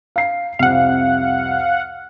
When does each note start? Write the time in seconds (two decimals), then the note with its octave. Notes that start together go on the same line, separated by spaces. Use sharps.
0.16 F5 C7
0.59 C2 F2 F5 F#5